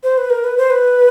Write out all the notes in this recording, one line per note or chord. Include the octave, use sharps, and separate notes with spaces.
C5
B4
A#4
B4
C5
B4